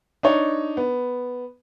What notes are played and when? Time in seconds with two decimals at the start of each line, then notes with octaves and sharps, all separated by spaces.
0.23 D4 D#4 C#5
0.77 B3